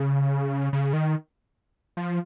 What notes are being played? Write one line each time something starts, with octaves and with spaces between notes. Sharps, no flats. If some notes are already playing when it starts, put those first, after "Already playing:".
Already playing: C#3
C#3
D#3
F3